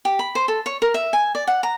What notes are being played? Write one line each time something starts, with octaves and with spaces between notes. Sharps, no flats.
G4
B5
C5
A4
C#5
A#4
E5
G#5
D5
F#5
A#5